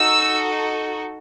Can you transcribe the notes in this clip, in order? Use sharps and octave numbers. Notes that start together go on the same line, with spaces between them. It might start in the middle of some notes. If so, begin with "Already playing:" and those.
Already playing: D#4 F#4 A4 E6